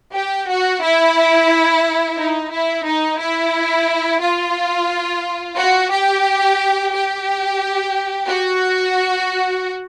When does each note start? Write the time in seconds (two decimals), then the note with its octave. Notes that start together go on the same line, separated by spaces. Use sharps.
0.14 G4
0.48 F#4
0.82 E4
2.18 D#4
2.52 E4
2.86 D#4
3.19 E4
4.21 F4
5.57 F#4
5.91 G4
6.92 G4
8.28 F#4